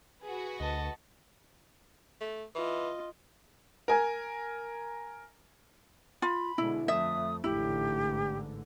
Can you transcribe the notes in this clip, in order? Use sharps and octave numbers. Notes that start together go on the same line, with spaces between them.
F#4 G#4 B4
D2 D#5 A5
A3
E3 F4 D#5
A#4 G#5
F4 B5
B2 D3 G#3 E4
F2 A3 E5 D#6
A1 G#2 D3 E4 G4